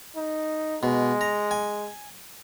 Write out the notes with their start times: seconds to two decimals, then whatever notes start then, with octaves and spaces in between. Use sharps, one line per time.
0.16 D#4
0.83 B2 G#3
1.21 A#5
1.51 G#5